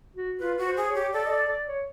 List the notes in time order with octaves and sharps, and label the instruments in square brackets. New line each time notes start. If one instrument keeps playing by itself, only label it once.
[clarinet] F#4
[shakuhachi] F4 [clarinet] B4
[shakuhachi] F#4
[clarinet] C5
[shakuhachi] G#4
[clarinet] C#5
[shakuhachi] G4
[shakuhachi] A4 [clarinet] D5
[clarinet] D#5
D5
D5
C#5